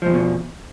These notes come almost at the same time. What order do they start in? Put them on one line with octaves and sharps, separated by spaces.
F3 G#2 E2 B2